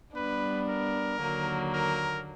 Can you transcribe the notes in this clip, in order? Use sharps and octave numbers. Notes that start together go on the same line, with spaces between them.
G3 B3 D4 B4
A#4
D#2 D3 F#3 A#3
A#4